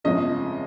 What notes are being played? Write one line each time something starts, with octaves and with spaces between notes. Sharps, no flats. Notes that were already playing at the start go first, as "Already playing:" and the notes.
G1 F2 C#3 F3 G#3 D#5